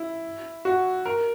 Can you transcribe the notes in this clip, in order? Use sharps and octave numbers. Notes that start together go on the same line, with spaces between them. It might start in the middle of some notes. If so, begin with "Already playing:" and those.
Already playing: E4
F#4
A#4